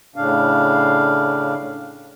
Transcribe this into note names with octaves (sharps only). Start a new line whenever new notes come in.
A2 C#3 D4 F5